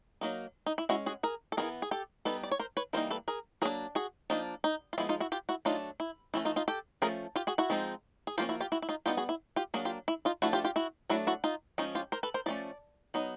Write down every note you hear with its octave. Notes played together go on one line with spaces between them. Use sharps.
F#3 A#3 D#4
D#4
E4
G#3 C#4 E4 F#4
F#4 G#4
G#4 A#4
A4
E3 G#3 B3 G#4 A#4
G#4
G4 A4
G3 B3 D#4 A4 B4
D5
C#5
A#4 C5
B4 C#5
E3 G3 A#3 D#4 A#4 C5
A4 B4
G#4 A#4
F#3 A#3 D4 G#4 A#4
F#4 G#4
F3 A#3 D4 D#4
D#4
F4
F3 G#3 B3 E4
D#4 F4
E4 F#4
F4 G4
E4 F#4
F#3 A3 D4 D#4 F4
E4
E3 A3 C#4 E4
D#4 F4
D#4 F4
G4 A4
F3 A3 C#4 G#4 A#4
F4 G4
F#4 G#4
E4 F#4
F3 G#3 C4 D#4
G#4
F3 A#3 C#4 F4 G4
E4 F#4
F4 G4
E4 F#4
E4
D#4 F4
G3 B3 D#4 F4 G4
F#4 G#4
E4
F4 G4
F#3 A#3 D4 F#4 G#4
F4 G4
E4
D#4 F4
F3 A3 D4 E4 F#4
F4 G4
F4 G4
E4 F#4
F#3 A3 D4 E4 F#4
E4 F#4
D#4 F4
F3 G#3 C#4 D#4
F4 G4
A#4 C5
A4 B4
A#4 C5
F3 A3 C#4 D5
F#3 B3 D#4